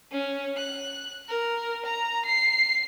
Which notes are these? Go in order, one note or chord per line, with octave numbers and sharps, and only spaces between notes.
C#4
F#6
A#4
A#5
C7